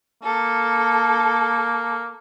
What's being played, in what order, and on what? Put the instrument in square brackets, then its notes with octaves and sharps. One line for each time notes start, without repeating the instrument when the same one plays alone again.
[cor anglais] A#3 [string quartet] A4